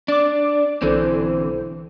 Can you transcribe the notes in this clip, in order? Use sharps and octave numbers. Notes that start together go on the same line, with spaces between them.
D4 D5 D6
B1 D3 E3 C4 A4 C5